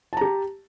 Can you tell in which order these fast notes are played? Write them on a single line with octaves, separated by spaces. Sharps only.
A5 A#5 G4